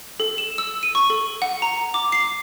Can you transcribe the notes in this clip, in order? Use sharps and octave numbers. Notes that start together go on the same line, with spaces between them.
A4
E7
E6
D#7
C#6
A4
F#5
A#5
D6
C7